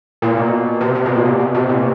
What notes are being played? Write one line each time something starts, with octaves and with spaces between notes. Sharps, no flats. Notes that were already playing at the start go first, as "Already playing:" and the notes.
A#2
B2
C3
C3
B2
A#2
B2
B2
C3
A#2